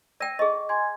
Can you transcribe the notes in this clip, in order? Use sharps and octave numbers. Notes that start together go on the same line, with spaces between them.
D5 G5 E6 A#6 D#7
G#4 D#5 C#6
G#5 C6 G#6